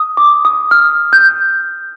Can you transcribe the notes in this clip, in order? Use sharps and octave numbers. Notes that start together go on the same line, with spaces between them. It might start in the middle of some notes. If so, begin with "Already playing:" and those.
Already playing: D#6
D6
D#6
F6
G6